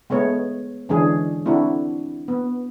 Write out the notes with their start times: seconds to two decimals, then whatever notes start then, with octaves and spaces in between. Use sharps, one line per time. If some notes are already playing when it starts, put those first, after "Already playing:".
0.10 G#3 A3 B3 C#5
0.89 D3 E3 G#3 C#4 D4 G#4
1.46 A3 C4 D4 E4 F#4
2.28 B3